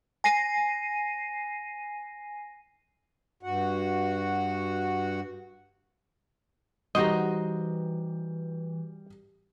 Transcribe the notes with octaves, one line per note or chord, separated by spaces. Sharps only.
G#5 A#6 C7 D#7
G2 F#4 F#5
E3 G3 D#4 F#4 G4 C5 D#5